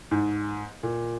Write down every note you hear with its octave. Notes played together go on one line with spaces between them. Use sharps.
G#2
A#2